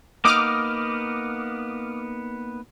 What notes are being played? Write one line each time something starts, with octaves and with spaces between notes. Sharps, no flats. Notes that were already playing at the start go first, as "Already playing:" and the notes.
A#3 B3 D#4 D6 D#6 F6